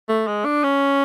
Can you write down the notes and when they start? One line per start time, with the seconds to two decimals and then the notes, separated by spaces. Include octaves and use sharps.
0.09 A3
0.27 G#3
0.45 D4
0.64 C#4